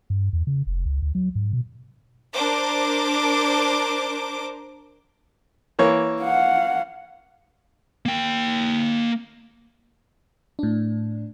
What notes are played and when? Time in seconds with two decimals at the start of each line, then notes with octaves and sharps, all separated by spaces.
0.10 G2
0.33 E2
0.47 C#3
0.67 F1
0.85 C#2
1.02 D2
1.15 F#3
1.35 G#2
1.53 B2
2.33 D4 A#4 C5 D6
5.79 E3 A#3 C#5
6.22 F5 F#5
8.06 A#3 G5
10.59 A2 D4